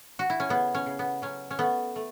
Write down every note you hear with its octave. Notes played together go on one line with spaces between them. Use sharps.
F#4
E4
C#4
C#3 B3
C#4
C#3
B3
F#3 C#4
C#4
A3 B3
A3